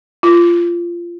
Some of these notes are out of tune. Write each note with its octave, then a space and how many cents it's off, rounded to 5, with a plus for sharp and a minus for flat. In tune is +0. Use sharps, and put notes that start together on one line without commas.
F4 -20